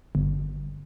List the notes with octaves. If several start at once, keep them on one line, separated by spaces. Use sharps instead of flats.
G1